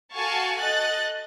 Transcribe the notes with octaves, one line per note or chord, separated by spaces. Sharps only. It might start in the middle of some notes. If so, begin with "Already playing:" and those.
F#4 A4 F5 G#5 A5 C#6
A4 D#5 F#6 A6